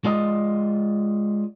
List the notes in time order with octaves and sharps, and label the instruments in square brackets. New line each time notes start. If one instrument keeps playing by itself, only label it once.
[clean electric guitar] G#3 F4 D5 D#5